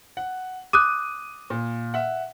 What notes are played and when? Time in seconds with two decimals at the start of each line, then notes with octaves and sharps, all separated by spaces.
0.17 F#5
0.73 D6 D#6 F#6 D#7
1.50 A#2
1.94 E5 F#5